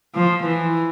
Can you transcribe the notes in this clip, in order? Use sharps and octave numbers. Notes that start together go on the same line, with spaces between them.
F3
E3